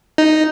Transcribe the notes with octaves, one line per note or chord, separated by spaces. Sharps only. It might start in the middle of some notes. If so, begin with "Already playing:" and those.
D#4